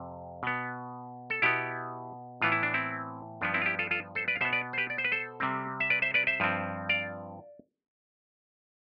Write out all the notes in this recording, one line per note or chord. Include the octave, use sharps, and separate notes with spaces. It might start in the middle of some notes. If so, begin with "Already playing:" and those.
Already playing: F2 C3
B2 B3
A4
B2 B3 E4 G4
A2 E3 B3 F4
E4
D4
C4 E4
G2 F3 B3 D4
C4 E4
F4
E4 G4
F4 A4
F4 A4
A4 C5
B4 D5
F5
B2 B3 C5 E5
B4 D5
C5
G4 B4
D5
C5
B4
A4 C5
C3 G3 C4
E5
B4 D5
C5 E5
B4 D5
C5 E5
G2 F3 C4
D5 F5